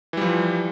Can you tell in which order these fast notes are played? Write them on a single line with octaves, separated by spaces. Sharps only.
E3 G3 F3